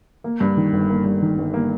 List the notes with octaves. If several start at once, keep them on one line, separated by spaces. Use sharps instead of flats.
A#3
G2
D#3
G1
A#3
G2
D#3
G1
A#3